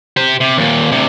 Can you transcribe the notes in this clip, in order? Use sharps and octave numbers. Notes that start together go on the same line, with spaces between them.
G4 C5
C3
D#2 A#2
D2 C3